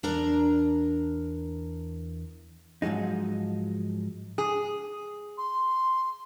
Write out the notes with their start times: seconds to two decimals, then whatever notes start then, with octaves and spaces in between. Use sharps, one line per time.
0.03 E2 D4 A#4 A#5
2.82 G#2 F3 F#3 G#3 D#4
4.38 G#4
5.38 C6